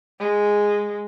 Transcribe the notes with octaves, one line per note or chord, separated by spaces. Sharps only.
G#3